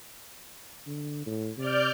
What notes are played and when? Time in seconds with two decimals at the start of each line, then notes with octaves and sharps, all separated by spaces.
0.87 D3
1.26 A2
1.58 C3 D5 F6 G6